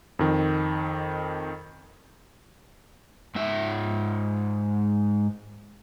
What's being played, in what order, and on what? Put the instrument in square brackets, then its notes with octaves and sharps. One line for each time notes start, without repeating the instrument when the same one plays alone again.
[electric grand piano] F2 D#3
[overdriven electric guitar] G#2 E5